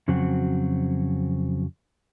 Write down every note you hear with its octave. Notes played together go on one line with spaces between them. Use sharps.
F2 C#3 F#3 C4 F#4